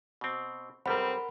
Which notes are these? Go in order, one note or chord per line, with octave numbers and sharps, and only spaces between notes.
B2 C4
B1 G3 C4 A#4 F#5 B5